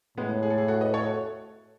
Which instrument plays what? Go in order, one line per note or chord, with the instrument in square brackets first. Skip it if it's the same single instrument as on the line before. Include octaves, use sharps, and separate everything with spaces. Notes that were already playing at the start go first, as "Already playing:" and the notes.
[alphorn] A2 [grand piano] G#3 B3
[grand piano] G#4
A4
E4 G#4
F#4 A4
B4 D#5
A4 C#5
F#4 A4